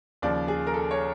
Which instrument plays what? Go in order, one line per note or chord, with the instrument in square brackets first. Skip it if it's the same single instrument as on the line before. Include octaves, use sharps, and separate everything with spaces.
[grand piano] D#2 C#3 F3 D5
G#4
A#4
A4
C#5